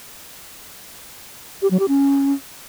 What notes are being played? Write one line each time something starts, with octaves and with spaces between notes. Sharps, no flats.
G4
F#3
G4
C#4